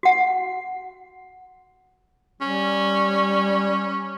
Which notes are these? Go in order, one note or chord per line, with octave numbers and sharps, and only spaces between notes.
F#4 F#5
G3 C#4